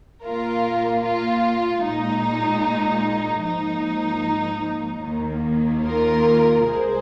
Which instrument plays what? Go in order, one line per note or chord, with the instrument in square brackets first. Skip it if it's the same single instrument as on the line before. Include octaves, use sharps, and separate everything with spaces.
[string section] A#2 A#3 F4 A#4
F4
A#2 G#3 D#4
G#2 F3 A#3 D#4
D#2 D#3 A#3
F4 A#4
C2 C3 G#3 G#4 C5